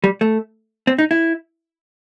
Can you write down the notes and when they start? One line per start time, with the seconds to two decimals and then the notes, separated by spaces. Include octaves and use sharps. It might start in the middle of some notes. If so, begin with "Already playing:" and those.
0.04 G3
0.21 A3
0.87 C4
0.99 D#4
1.11 E4